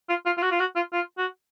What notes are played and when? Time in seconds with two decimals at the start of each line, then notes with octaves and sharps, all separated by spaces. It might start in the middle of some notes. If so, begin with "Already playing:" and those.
0.09 F4
0.26 F4
0.38 F4
0.42 F#4
0.52 F4
0.60 F#4
0.76 F4
0.93 F4
1.18 F#4